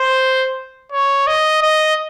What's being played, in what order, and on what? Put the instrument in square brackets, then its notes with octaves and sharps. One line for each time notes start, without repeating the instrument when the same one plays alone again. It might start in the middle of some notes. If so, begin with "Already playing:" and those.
Already playing: [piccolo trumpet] C5
C#5
D#5
D#5